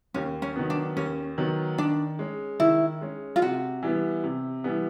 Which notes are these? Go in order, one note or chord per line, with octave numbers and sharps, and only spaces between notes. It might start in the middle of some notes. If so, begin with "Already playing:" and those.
D#2 C#4
C#4
D#3 F#3 B3
D4
D#2 C#4
D#3 F#3 B3
D#3 D4
G#3 C#4
D#3 E4
G#3 C#4
F4
C3 F#4
E3 G3 B3
C3
E3 G3 B3